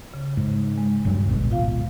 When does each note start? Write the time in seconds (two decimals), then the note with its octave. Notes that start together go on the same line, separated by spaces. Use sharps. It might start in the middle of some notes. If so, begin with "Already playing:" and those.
0.14 C#3
0.37 G#2
0.78 G#3
1.05 D#1 G2 F#3
1.29 D1 G#1 B2
1.51 F4 F5